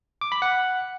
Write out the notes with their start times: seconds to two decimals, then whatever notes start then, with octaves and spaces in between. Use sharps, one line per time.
0.21 D6
0.32 B5
0.42 F#5